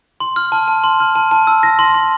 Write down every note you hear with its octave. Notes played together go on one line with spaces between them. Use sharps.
C6
F6
A5
A5
C6
F6
A5
A5
E6
A#6
C6
C6